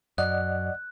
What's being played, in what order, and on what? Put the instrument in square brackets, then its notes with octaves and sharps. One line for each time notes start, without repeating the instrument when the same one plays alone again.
[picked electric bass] F#2 [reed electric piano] D5 D#5 F#5 [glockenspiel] F#6